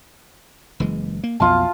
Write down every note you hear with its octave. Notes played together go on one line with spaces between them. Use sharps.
F#1 E3 G#3
A#3
B1 F2 B3 F4 A5